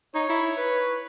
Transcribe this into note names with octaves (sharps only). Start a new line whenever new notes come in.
D#4 C#5
E4
B4